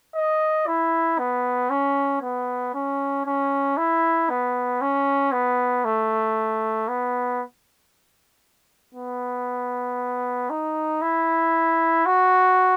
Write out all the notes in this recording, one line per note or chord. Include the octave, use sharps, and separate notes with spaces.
D#5
E4
B3
C#4
B3
C#4
C#4
E4
B3
C#4
B3
A3
B3
B3
D#4
E4
F#4